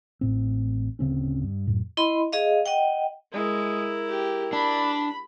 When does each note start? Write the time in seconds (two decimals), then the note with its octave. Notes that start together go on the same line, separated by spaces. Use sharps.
0.21 A1 A2 C4
0.99 D1 C#3 C4 C#4
1.44 G2
1.67 F#2 A2
1.97 E4 D#5 B5 C6
2.33 G#4 D#5 F5
2.66 D#5 F#5 G5
3.33 G#3 E4 A#4
4.09 G4
4.53 D4 B5